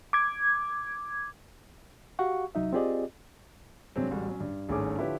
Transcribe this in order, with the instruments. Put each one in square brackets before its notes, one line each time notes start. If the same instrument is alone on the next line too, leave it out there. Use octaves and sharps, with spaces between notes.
[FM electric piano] D6 G#6
[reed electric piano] F#4 G4 F5 F#5 C#6
C2 F#3 D#4 E5
C4 F4 G4 G#4 D5 D#5
[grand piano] G2 C3 F#3 G#3 C4
A1 G3 G#3 F#4
F#3 C#4
G2
G#1 G2 A3 C#4 G#4 D6
D3 F3 E4 G4 B4 C#5